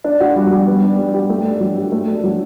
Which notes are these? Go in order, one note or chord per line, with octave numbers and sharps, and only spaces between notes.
D4
F#4
G3
G3
B3
D4
G3
G4
A3
D4
F#3
G4
A3
D4
F#3